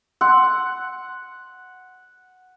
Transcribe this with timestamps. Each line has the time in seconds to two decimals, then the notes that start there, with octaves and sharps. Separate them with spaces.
0.21 F#5 C6 E6